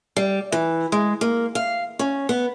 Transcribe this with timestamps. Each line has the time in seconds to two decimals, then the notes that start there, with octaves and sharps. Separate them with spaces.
0.17 G3
0.52 E3
0.92 G#3
1.21 A#3
1.55 F5
1.99 C#4
2.29 B3